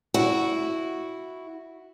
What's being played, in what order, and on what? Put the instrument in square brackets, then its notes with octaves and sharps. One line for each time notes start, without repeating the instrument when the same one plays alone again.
[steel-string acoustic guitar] E4 F#4